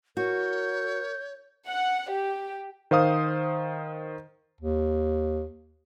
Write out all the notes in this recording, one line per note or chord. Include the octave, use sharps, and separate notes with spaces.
F#4 A#4 C#5 G6
F#5
G4
D#3 C5 F5 D#6
D#2